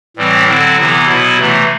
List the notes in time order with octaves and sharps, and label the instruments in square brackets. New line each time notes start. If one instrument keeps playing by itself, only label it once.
[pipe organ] A2 E3 G3 C4
D3 F#3 C4 E4
C3 E3 B3 E4
B2 F#3 B3 E4
C3 E3 A3